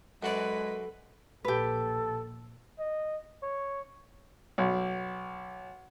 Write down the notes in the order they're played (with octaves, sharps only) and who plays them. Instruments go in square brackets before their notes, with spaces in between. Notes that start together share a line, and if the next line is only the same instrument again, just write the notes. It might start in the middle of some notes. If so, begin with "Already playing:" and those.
[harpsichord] F#2 F#4 D5 [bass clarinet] G#3 [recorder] A4 [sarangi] B4
[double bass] A#1 A#2 [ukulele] G4 B4 [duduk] A4
[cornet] D#5
C#5
[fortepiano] B1